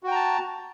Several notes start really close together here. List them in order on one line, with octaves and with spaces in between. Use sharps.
F#4 G5 A#5 A5